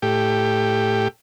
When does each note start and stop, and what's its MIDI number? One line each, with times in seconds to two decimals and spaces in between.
0.02 1.08 45
0.02 1.08 67